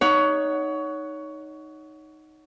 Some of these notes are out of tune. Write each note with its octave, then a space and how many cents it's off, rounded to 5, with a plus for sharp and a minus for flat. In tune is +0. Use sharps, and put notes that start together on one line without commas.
D#4 +0 C#5 +20 F#5 +0